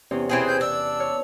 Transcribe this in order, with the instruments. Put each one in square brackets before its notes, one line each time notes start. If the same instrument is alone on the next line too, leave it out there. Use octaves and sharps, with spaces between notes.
[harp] E2 C3 C#4
[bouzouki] E3 C4 G#4 [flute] G5
[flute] G6
[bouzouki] D4 [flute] E6
[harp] C#5 F6